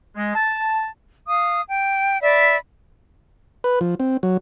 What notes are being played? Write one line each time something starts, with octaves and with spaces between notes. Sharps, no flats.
G#3
A5
F5 D#6
G5
D5 E5 B5
B4
F3
C4
F#3